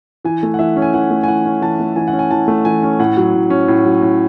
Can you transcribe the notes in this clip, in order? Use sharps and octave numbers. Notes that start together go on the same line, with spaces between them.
E3 G#5
A3
F#5
E3 E5
C#4
G#5
E3 F#5
A3
G#5
E3 F#5
C#4
E3 A5
A3
E3 G#5
F#5
C#4
G#5
E3 A5
A3
E3 G#5
C#4
A2 F#5
F#3
A2
C#4
A2
F#3
A2